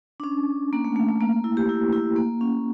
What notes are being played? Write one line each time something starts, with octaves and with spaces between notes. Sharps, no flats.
D4
C#4
A#3
A3
A3
A3
A#3
A#3
E4
G4
E4
E4
A#3
C#4